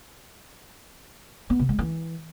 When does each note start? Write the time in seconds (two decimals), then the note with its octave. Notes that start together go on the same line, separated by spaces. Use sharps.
1.50 B3
1.59 C3
1.69 G#3
1.79 E3